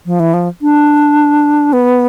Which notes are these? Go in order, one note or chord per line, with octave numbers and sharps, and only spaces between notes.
F3
E3
F3
D4
B3